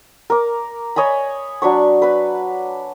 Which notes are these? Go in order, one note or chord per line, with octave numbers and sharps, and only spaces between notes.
A#4 D6
C#5 D#5 G#5 B5
F#3 D4 B5 C#6
B4 B5